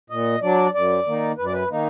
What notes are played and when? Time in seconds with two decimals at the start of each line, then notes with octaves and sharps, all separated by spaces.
0.10 A#2 D#5
0.42 F#3 D4 D5
0.74 F#2 D5
1.06 D#3 A#3 D#4
1.38 F#2 B4
1.46 D5
1.53 B4
1.70 D#3 A#3 D#4